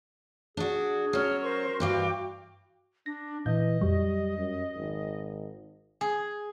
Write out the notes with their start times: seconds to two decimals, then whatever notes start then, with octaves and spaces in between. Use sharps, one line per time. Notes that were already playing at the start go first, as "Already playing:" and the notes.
0.57 D4 F#4 G#4
1.13 F#3 C#4 C#5 F6
1.43 A#4 C5 C#6
1.80 G2 E3 F#4 F5 G5 D6
3.06 D4 A#6
3.46 A#2 E3 D#5 G6
3.81 F2 F#3 G3
4.37 F#2
4.77 G#1
6.01 G#4